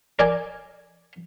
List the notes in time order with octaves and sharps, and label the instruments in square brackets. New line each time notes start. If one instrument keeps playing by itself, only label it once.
[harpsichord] A#4 D5 D#5 G#5